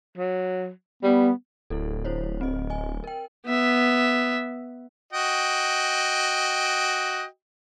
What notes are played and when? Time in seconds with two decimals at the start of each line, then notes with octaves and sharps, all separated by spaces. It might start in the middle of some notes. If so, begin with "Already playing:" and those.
0.17 F#3
1.03 G3 B3
1.70 D1 E4 A4
2.05 E4 C5 C#5
2.41 C4 D#5
2.70 D#5 G#5
3.04 A#4 G5
3.46 B3 E5
5.13 F#4 D#5 G5